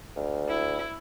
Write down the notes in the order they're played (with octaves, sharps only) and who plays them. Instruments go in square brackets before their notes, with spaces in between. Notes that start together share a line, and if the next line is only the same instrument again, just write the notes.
[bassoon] D2
[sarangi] E4